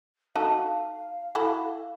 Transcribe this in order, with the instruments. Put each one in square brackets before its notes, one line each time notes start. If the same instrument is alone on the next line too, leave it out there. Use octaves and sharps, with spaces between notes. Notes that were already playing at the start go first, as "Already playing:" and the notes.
[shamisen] D#4 F#4 A4 [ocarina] F5 [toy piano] A5
[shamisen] E4 F#4 A4